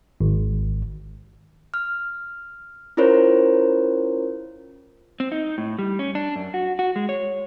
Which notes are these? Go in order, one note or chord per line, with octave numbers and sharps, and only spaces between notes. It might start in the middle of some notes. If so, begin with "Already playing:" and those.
G#1
F6
C#4 E4 F4 A#4 C5 C#5
C4
D#4
A2
G3
C#4
D4
F#2
F#4
F#4
G#3
C#5